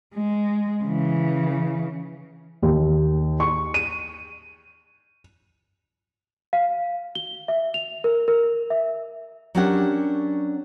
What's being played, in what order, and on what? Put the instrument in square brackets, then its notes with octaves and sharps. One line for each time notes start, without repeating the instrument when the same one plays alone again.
[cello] G#3
C#3 E3
[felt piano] D#2
C#6
D#7
[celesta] F5
G7
E5
F7
A#4
A#4
E5
[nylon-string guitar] F#3 C#4 D4 G4 A#4 F#5